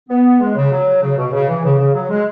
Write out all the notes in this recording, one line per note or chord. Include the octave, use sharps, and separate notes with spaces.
B3
G#3
C#3
F#3
C#3
B2
C#3
E3
C#3
C#3
F#3
G#3